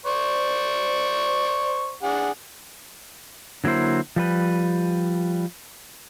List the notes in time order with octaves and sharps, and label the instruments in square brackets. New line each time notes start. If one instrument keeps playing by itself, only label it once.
[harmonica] C5 D5 C#6
D4 G#4 F#5
[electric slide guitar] D3 F#3 A#3 E4 C5
F3 G3 B4